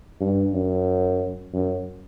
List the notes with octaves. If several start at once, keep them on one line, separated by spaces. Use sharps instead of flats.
G2
F#2
F#2